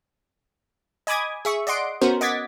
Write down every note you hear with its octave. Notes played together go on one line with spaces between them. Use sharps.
D#5 G#5 B5 D6 D#6 G#6
G#4 E5 C#6
D5 D#5 F#5 C6 D7
B3 C#4 F#4 A#4 C5
D#5 F#5 D6 G#6 A6 B6